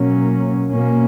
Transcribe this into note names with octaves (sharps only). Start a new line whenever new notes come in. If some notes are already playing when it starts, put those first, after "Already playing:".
Already playing: B2 F#3 A#3 C#4
B2 A#3 C#4